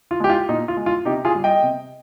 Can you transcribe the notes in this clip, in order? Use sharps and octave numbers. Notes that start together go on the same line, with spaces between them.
F4
G#3 G4
F4
A#2 D#4
F4
G#3
F4
C3 D#4 G4
F4 G#4
G3
D#5 G5
C3